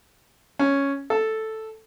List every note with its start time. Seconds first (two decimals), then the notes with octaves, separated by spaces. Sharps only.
0.59 C#4
1.10 A4